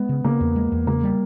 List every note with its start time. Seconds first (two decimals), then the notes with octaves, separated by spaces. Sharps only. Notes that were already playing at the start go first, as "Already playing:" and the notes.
Already playing: G#3 B3
0.09 C#3
0.24 C#3 A#3
0.40 E2
0.56 G#3
0.72 E2
0.87 C#3 A#3
1.03 G3